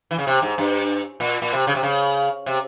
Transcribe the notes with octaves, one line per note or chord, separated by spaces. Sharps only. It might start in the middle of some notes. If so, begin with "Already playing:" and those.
E3
C#3
C3
G#2
G2
A#2
A#2
C3
C#3
C3
C#3
C3